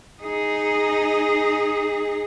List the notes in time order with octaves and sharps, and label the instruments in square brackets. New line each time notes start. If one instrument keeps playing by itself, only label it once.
[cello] D#4 G#4